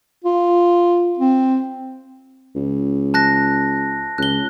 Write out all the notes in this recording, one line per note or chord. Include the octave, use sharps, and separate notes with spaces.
F4
C4
C#2
A5 F#6 A#6
C#2 F#6 G7